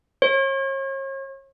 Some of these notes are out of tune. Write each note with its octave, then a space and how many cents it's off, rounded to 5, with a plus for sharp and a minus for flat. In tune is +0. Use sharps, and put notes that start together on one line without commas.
C#5 -40